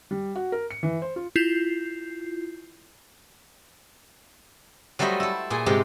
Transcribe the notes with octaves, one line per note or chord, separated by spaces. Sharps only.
G3
F#4
A#4
C#7
E3
C5
F4
E4 F4 G6 C7
F#3 G3 A3 C5 D#5 B5
E4 A4
A#2 G#4 G#5
G#2 C3 G#3 G4